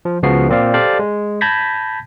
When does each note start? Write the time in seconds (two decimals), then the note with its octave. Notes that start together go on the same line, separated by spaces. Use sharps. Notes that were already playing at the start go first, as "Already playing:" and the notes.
0.05 F3
0.23 C#2 C#3 F3 B3 F#4 C7
0.48 A#2 A#3 C4 D5 F5
0.74 G4 A4 C5 D5 F5 A5
0.99 G#3
1.41 A5 B5 G6 G#6 A#6 B6